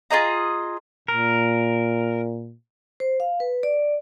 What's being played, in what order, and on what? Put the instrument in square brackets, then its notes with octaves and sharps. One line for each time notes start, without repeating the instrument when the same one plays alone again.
[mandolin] F4 G#4 D#5 A#5
[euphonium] A#2 [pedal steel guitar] A#4
[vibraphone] C5
F5
B4
D5